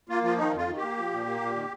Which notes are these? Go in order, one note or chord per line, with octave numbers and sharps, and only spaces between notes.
A#3 F4
F3 F4
D#3 D#4
F2 F4
D#3
G4
A#3
F3
A#2
A#3
A#2
D#3